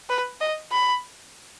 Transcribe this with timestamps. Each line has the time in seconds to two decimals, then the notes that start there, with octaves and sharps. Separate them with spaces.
0.09 B4
0.41 D#5
0.71 B5